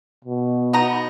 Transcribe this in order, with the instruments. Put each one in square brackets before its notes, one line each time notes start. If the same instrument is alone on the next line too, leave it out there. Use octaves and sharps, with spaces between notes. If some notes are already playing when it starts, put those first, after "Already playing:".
[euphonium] B2
[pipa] B3 D#4 A#5